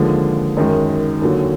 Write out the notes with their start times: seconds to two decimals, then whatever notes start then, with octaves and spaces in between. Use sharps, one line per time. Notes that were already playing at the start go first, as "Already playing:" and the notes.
Already playing: D#2 D3 F3 G#3 G#4
0.57 F#2 D#3 G#3
1.22 D#2 D3 F#3